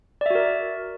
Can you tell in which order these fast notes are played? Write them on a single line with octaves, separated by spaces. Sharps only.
D5 E5 F#4 A#4